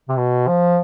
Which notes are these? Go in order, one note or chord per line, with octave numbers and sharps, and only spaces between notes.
C3
B2
F3